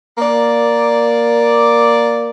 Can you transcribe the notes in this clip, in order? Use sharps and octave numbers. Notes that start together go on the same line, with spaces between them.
A#3 D5